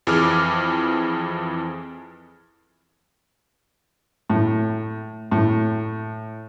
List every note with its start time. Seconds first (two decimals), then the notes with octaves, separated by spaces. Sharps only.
0.07 F2 E3 G#4 D6 F6
4.30 A2
5.32 A2